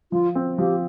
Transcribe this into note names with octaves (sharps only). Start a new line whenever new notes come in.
F3 F4
C4
F3 G4